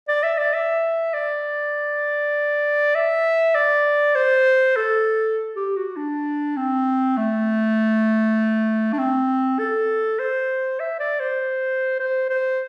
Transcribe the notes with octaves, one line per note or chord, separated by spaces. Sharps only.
D5
E5
D5
E5
D5
E5
D5
C5
A4
G4
F#4
D4
C4
A3
D4
C4
A4
C5
E5
D5
C5
C5
C5